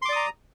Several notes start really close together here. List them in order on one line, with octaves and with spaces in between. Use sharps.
C6 D6 D5 D#6 A#5